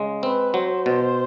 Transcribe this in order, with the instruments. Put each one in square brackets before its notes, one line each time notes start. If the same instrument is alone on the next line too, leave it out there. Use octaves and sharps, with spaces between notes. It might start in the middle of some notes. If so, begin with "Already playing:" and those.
Already playing: [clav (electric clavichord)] C#3 G#3
[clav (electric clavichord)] C4 [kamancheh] B4
[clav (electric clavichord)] F#3 [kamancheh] C5
[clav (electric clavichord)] B2